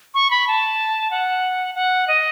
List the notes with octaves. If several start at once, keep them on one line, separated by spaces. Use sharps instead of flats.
C#6
B5
A5
F#5
F#5
D#5